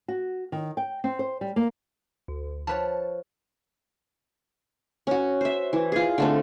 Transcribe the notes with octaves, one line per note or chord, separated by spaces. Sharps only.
F#4
D#3
G5
C4
C5
G3
A#3
D2
F3 B4 C#5 A5
C#4 F#4
C5 E5
E3
F4 G#4
D3 A3 C4